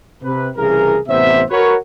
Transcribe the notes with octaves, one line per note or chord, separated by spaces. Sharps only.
C3 B4
C2 C#3 E3 G#4 A#4
A1 C3 B3 C5 E5
F#4 A#4 B4 C#5